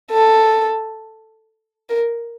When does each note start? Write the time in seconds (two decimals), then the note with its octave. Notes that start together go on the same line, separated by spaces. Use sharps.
0.11 A4
1.89 A#4